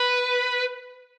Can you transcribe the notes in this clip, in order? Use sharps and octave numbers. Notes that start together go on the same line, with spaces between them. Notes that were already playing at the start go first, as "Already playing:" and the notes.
Already playing: B4